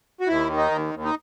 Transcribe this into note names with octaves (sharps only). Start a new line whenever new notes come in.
F#4
D#2 E4
D#3
D#4
D#2
D#2
D#4